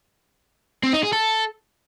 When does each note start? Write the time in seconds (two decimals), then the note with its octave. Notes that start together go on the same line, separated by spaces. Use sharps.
0.83 C4
0.93 D#4
1.03 G#4
1.13 A4